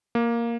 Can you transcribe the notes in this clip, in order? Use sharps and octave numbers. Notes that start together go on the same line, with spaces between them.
A#3